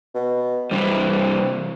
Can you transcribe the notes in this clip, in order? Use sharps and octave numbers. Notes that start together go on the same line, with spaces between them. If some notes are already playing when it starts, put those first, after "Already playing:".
B2
C3 E3 G3 C4